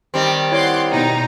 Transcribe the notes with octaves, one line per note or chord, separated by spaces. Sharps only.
D#3 G3 C4
E4 C#5 F#5 G5 C6 D6
B2 D#4 A#5